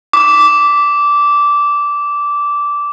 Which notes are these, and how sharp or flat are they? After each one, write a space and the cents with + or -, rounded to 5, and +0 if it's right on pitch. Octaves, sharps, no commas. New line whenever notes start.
D6 -15